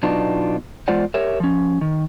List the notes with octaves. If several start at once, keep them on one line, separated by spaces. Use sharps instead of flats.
B2 F#3 B3 D4 D#4 F4
E2 G#3 F4 C5 D5 F#5
G4 A#4 C#5 E5
F3 C#4
D#3